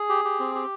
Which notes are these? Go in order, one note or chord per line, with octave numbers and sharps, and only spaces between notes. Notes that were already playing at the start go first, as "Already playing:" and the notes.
Already playing: G#4
G4
G4
C4
G4